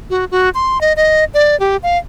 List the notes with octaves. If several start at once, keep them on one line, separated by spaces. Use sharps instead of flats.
F#4
F#4
C6
D#5
D#5
D5
G4
F5